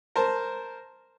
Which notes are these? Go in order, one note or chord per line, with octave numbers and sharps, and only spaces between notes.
A#4 C5 A5